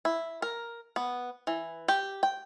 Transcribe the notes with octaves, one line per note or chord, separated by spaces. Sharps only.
E4
A#4
B3
E3
G4
G5